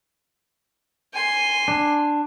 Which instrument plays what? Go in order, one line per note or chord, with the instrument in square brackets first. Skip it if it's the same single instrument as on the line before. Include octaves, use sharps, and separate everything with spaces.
[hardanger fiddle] G#5 C6
[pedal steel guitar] D4